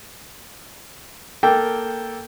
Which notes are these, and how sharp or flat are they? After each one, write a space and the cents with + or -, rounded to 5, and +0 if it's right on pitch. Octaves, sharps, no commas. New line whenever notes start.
A#3 +0 A4 +0 G5 +0